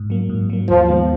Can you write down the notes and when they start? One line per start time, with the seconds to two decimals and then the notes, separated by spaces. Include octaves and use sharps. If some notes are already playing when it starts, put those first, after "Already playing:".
Already playing: G#2
0.10 F#3 A#3
0.29 G#2
0.50 F#3 A#3
0.69 D#2 F3
0.88 D#3 G#3 B3